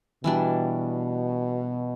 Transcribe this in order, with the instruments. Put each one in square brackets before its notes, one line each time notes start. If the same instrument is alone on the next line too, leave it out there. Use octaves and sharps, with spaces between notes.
[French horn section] B2 [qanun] E3 G3 D4